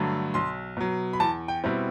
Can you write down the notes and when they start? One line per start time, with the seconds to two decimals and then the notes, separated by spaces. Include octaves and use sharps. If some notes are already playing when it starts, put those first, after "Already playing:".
Already playing: G2 D3 F#3 A3
0.34 B1 C6
0.77 B2 F#3
1.13 B5
1.20 E2 A5
1.48 G5
1.64 B2 G3 C4 E4